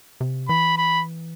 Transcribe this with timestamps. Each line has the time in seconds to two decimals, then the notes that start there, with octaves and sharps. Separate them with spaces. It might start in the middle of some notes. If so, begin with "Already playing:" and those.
0.21 C3
0.49 E3 B5
0.78 B5